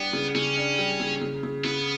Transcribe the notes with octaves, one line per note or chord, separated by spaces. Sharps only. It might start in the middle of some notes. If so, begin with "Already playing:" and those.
Already playing: G3 B3 D4 G4
C#3
C#3 C#4
D4
G3
C#3
C#3
C#3
C#3 B3